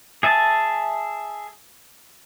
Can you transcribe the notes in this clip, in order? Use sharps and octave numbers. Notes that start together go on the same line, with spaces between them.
G#4 E5 G#5 A5